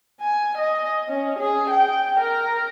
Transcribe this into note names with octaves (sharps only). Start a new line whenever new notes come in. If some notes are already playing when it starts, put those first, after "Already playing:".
G#5
D#5
C#4
G#4
G5
A#4